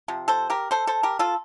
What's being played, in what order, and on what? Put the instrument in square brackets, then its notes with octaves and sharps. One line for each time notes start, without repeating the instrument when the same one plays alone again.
[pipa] C3 F3
A4 C5
G4 A#4
A4 C5
A4 C5
G4 A#4
F4 A4